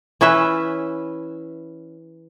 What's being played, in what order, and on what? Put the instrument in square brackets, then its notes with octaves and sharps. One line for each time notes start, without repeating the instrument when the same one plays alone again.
[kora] E3 C#4 B4 E5